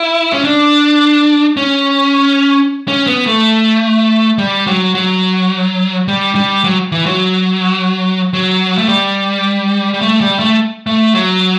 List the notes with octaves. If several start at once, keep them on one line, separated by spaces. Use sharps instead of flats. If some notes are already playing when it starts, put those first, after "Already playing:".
Already playing: E4
C#4
D4
C#4
C#4
B3
A3
G3
F#3
F#3
G3
G3
F#3
E3
F#3
F#3
A3
G3
G3
A3
G3
A3
A3
F#3